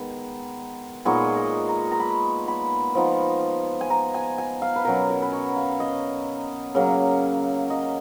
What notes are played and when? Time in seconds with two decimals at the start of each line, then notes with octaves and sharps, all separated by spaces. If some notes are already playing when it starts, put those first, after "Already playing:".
Already playing: D#3 G#3 B3
1.05 A#2 G#3 B3 D#4 C#5
1.37 D#5
1.69 A#5
1.91 A#5
2.00 B5
2.48 B5
2.95 F3 B3 D#4
3.81 G#5
3.90 A#5
4.14 G#5
4.38 G#5
4.62 F5
4.76 B4
4.85 B2 F#3 C#4 A#4
5.09 A#4
5.22 B4
5.33 C#5
5.56 F5
5.80 D#5
6.75 C#3 F#3 A#3
7.70 D#5